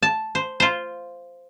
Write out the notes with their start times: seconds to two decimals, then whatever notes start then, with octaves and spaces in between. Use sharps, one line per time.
0.03 A5
0.35 C5
0.60 F4 C5